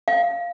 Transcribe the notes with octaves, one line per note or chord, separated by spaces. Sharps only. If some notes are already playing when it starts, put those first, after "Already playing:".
F5